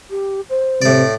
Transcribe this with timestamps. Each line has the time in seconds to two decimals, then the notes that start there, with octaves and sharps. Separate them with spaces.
0.10 G4
0.50 C5
0.82 A2 C3 D5